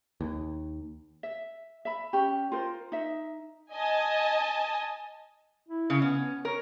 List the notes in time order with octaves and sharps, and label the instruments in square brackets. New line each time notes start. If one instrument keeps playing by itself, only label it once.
[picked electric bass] D#2
[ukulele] E5
E5 B5
C#4 G4
F4 A#4 C5
D#4 E5
[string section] D#5 G#5 A5
[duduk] E4
[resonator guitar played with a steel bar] C#3
[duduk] B3 [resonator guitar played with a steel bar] C#4
[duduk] B3
[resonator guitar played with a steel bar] A#4 [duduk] C#5